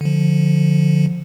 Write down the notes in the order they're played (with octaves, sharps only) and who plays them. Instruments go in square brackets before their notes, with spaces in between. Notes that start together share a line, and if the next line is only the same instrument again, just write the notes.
[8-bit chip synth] D3 F3